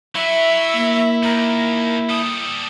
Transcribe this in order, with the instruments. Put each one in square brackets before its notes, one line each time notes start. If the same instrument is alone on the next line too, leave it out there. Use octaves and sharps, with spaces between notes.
[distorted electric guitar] F#3 F#4 [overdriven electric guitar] E4 [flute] E5
[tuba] A#3
[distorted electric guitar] D#2 [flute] A#4
[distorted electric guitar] G3 A4 [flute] D#6